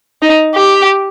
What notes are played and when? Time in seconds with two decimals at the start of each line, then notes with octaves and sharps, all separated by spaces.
0.22 D#4
0.55 G4